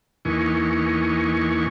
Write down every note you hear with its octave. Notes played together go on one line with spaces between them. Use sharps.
E2 E3 A#3 D#4 G#5 C#6